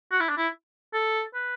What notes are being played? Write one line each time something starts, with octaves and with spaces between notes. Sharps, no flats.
F#4
E4
D4
E4
A4
B4